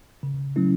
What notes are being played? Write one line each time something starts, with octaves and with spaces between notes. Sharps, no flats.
C#3
F#3 A3 C#4 E4